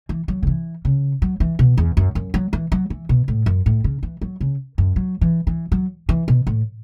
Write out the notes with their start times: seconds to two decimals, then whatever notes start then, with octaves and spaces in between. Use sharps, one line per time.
0.09 E3
0.28 F#3
0.43 C#3
0.47 E3
0.85 C#3
1.22 F#3
1.40 E3
1.59 B2
1.77 E2
1.97 F#2
2.15 F#2
2.34 F#3
2.53 E3
2.72 F#3
2.90 E3
3.09 B2
3.28 A2
3.46 F#2
3.66 A2
3.84 C#3
4.03 E3
4.21 F#3
4.41 C#3
4.78 F#2
4.96 F#3
5.21 E3
5.47 E3
5.72 F#3
6.09 E3
6.28 B2
6.47 A2